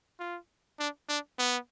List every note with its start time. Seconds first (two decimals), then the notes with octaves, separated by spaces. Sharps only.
0.19 F4
0.79 D4
1.09 D4
1.39 B3